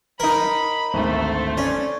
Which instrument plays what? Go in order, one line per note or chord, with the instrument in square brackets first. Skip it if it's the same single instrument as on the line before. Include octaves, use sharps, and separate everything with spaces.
[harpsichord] D#4 A#4 [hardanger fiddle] B5
[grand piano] G#1 D2 [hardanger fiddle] A3 C5
[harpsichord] C#4 [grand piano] D5